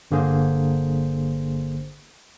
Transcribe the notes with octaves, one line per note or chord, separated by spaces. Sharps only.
G1 D3 A#3 G#4 C5